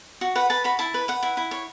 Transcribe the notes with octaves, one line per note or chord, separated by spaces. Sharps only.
F#4
B4 F#5
B4 A5
F#4 B5
E4 A5
B4
B4 F#5
E4
E4
C#5